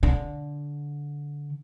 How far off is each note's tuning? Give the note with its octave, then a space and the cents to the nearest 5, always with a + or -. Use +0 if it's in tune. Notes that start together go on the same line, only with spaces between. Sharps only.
D3 -15